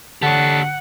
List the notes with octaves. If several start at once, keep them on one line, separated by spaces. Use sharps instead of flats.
D3 G4 C#5 F#5 A5